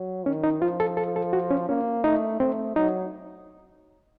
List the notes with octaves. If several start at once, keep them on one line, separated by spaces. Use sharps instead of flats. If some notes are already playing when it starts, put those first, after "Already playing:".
Already playing: F#3
D#3 C#4
D#4
F3 F4
A4
A4
A4
F#4
C#4
A#3 C#4
A3 D#4
A3 C4
F#3 D#4